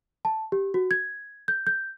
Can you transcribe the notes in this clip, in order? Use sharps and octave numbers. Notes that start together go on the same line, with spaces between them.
A5
G4
F#4
G#6
G6
G6